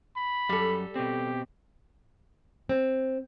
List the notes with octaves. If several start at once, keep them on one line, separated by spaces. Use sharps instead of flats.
B5
F#2 G3 A4
B2 C4 G4
C4